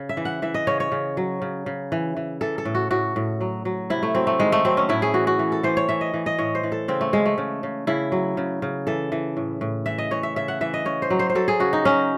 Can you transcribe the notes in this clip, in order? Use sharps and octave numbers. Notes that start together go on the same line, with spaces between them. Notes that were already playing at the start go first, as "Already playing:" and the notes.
Already playing: C#3
E5
E3
F#5
E3 E5
D#5
C#3 C#5
C#5
C#3
F#3
C#3
C#3
E3
E3
E3 A4
A4
A2
F#4
A2 F#4
A2
F#3
F#3
C3 E4
A3
F#3 C4
A3
D#3 G#3
A3
F#3 C4
C#4
A2 E4
G#4
E3 F#4
F#4
E3
A4
E3 C5
C#5
E3 E5
D#5
E3
D#5
A2 C#5
C5
E3
A4
C#3 C4
A3
C#3 G#3
A3
C#3
C#3
C#3 E4
F#3
C#3
C#3
E3 A4
E3
A2
A2
E3 E5
D#5
E3 C#5
E5
C#3 E5
F#5
E3 E5
D#5
C#3 C#5
C5
F#3
C5
C5
F#3 A4
G#4
C#3 F#4
D#4
F#3 C#4